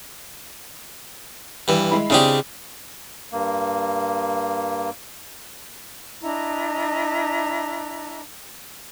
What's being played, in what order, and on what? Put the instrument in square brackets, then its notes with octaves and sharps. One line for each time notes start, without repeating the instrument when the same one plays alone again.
[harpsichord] G2 E3
[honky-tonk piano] G#3 E4 B5
[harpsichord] C#3 G#3 G4 [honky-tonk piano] C4 D4 E4
[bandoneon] G2 A#3
[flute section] D4 E4 D#5 A#5